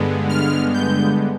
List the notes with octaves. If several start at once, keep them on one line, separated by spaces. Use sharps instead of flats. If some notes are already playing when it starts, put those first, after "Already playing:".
Already playing: G2 D3 G#3 B3
F6
G6